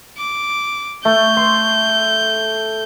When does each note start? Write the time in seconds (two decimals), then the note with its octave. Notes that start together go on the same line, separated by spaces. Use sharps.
0.18 D6
1.05 A3 G6
1.37 C6